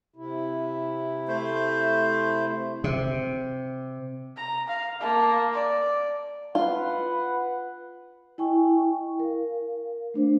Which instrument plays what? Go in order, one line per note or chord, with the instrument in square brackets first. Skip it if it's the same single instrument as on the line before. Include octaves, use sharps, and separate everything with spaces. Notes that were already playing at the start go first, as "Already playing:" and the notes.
[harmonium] C3 E4
[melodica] A3 C5
[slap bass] C3
[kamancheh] A#5
F5
A#3 A5
D5
[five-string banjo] F4 [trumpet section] B4 F#5
[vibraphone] E4 D#5 G5 G#5 C#6
A#4 F5
A3 D4 C5